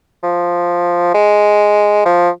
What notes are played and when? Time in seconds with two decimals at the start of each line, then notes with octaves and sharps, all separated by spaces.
0.23 F3
1.14 G#3
2.06 F3